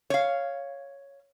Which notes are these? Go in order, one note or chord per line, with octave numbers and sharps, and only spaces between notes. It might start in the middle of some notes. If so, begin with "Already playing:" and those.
C#5 F5